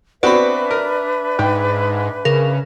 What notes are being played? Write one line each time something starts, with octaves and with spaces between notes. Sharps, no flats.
B3 C4 D4 F#4 B4 D5 E5 B5
A#4
G#2 G5
C#3 A#4